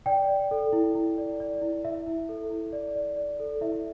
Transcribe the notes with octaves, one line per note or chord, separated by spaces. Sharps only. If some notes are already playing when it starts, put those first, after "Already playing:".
D5 G5
D5
A4
E4
E4
D5
D5
E4
E4 E5
E4
A4
E4
D5
D5
D5
A4
E4 E5